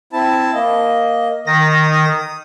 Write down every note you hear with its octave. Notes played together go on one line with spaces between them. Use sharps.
C4 E4 A5
A#3 D#5
D#3 D#6 A#6